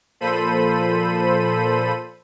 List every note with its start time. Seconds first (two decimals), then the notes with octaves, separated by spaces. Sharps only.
0.20 A#2 F3 A4 C5 B5 D#7